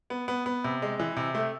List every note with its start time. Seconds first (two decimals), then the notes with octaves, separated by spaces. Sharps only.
0.10 B3
0.28 B3
0.46 B3
0.64 C3
0.82 G#3
1.00 E3
1.17 C3
1.35 A3